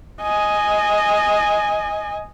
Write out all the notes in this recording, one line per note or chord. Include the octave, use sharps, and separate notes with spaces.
D#5 G#5